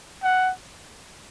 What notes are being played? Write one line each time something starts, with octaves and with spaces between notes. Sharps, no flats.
F#5